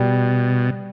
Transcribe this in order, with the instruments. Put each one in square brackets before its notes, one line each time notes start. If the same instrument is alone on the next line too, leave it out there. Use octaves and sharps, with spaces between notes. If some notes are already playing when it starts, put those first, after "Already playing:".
Already playing: [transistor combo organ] B2 [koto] G3